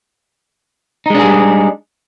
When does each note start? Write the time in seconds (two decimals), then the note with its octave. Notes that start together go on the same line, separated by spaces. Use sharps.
1.06 D#4
1.10 G#3
1.15 D4
1.19 G#4
1.23 G3